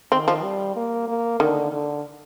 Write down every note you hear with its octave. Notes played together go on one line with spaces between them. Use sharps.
D#3 C4
F3
G3
A#3
A#3
D3 D#3
D3